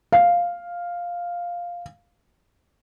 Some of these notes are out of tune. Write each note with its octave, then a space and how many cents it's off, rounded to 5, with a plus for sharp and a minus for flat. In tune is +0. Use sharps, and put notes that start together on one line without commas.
F5 +0